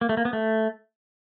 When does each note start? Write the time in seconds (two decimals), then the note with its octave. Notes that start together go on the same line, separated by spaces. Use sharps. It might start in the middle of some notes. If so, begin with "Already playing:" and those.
0.01 A#3
0.09 A3
0.17 A#3
0.25 B3
0.33 A3